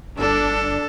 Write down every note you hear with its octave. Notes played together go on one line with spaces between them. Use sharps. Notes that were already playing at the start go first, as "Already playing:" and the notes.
G1 D4 A4